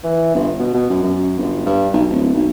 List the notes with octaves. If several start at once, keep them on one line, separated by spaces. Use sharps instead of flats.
E3
G1
B2
B2
F#2
F#2
G1
G2
B1
D1
B1